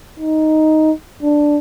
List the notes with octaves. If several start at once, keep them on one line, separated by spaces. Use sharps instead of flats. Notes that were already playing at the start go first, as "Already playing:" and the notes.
D#4
D4